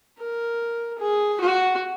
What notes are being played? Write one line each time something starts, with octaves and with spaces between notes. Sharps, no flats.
A#4
G#4
F#4